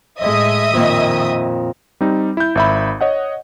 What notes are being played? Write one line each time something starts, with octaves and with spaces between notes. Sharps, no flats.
A2 G#3 D#5 E5 D#6
F2 A#2 D#3
G3 C4 D#4
E4 G6
G#1 E5 B5
C#5 D#5 F#5